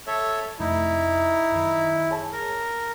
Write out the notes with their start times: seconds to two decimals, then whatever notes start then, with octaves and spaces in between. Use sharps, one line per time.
0.07 A4 C#5 E5
0.60 F2 C3 A3 D#4 E4
1.52 F#2 D#3
2.11 G#4 C#5 A5
2.32 A#4